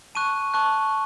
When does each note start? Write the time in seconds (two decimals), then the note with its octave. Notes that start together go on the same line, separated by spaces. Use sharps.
0.15 A5 C#6 F#6 D#7
0.54 A5 C#6 F#6